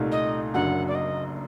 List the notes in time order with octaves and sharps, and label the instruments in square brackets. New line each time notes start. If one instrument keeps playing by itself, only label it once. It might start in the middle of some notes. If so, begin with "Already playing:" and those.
Already playing: [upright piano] C2 A#2 A3 D#4
[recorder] D#5
[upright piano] F#1 F#2 D3 F#3 [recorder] F#5
[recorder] D5
D#5